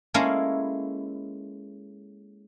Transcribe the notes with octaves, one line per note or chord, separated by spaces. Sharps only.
G#3 A#3 C#4 E4 A4 A#4